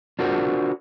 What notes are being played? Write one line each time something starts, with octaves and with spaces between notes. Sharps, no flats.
D4 F4 F#4 A#4 C5